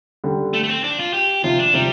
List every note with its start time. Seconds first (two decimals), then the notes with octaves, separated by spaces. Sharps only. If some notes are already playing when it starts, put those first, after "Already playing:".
0.24 D3 G3
0.54 A3
0.64 A3
0.69 C4
0.84 D4
0.99 F4
1.14 G4
1.44 C3 F3 F4
1.59 D4
1.74 C3 F3 G3